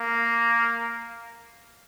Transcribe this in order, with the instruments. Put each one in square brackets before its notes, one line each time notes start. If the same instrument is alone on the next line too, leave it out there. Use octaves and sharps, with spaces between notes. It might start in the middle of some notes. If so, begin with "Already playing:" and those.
Already playing: [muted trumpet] A#3